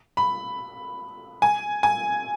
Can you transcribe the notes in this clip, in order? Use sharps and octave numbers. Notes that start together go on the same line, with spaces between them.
B5
G#5
G#5